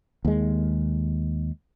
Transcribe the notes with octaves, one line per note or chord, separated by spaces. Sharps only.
D#2 G#3